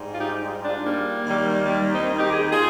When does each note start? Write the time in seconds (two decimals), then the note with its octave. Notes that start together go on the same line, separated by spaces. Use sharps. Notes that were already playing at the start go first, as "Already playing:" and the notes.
Already playing: G#2 G3
0.14 F4
0.20 D#4 G4
0.65 D4 F4
0.85 G3 A#3
1.26 D#2 D#3 G3
1.66 G3
1.93 C4 D#4
2.19 D#4 G4
2.32 G#4
2.52 F4 G#4